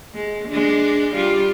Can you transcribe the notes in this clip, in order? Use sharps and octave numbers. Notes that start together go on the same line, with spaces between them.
G#3
G#3 D4
G3 F4